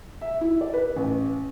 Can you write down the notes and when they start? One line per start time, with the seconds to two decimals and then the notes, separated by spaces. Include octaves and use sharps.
0.21 E5
0.41 E4
0.61 D5
0.73 B4
0.96 A1